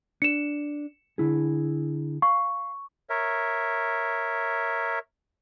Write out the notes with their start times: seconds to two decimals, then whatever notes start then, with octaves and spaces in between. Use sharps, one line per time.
0.22 D4 C#7 E7
1.18 D3 E4 G#4
2.22 F5 C#6
3.10 A#4 C#5 E5